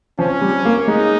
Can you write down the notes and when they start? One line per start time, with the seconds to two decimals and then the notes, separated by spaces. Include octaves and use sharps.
0.19 F3 C#4
0.42 G3
0.65 A#3
0.87 G#3 D#4